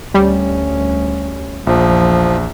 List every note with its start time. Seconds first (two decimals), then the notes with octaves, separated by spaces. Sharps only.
0.14 D2 G3 C#4
1.67 A#1 E2 F3